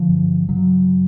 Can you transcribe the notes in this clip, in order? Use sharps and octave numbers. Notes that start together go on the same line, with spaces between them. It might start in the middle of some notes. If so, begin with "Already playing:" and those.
Already playing: D3 F3
G2
C#3 F#3